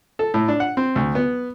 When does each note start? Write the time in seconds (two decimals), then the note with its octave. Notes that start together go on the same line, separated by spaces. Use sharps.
0.19 A4
0.34 A2
0.48 D4
0.60 F#5
0.77 C4
0.96 D2
1.15 B3